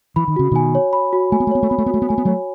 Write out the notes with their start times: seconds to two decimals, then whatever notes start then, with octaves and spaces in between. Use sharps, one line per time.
0.16 E3 B5
0.28 D#3
0.36 C#3 F#4
0.52 B2 D#3 G#5
0.75 C#5
0.93 B5
1.13 F#4
1.32 A3 G#5
1.40 B3
1.47 A3
1.51 B3 C#5
1.63 A3
1.70 B3 B5
1.78 A3
1.86 B3
1.90 A3 F#4
2.02 B3
2.09 A3 G#5
2.18 B3
2.25 F#3 A3 C#5